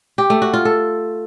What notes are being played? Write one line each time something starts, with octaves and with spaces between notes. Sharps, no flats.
G4
A3
F#4
F4
A4